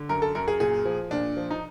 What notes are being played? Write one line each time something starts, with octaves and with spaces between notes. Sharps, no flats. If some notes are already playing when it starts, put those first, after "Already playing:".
Already playing: D3
F#2 A#4
A4
F#2 A#4
G#4
A#2 G#4
F3
A#2 D4
F3
D#4